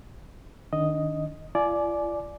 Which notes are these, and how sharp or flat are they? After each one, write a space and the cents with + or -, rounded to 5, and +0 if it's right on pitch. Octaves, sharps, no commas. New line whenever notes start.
D#3 -15 D4 -45 D#5 +0
F4 -45 D5 +0 G#5 +30